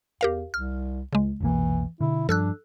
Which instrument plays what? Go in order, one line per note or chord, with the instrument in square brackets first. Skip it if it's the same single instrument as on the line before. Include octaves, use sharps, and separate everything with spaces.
[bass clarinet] E2 [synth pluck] G4 A#4 F5
[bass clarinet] C2 [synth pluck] F6
[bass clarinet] C#2 [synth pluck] C#3 G#3
[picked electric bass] F1 B1 A#3 [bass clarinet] E3
[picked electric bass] B2 D3 [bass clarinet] E4
[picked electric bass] G2 F3 [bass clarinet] D4 [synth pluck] A4 E6 F#6